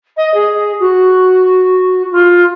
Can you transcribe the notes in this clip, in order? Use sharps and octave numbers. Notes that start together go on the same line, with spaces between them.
D#5
G#4
F#4
F4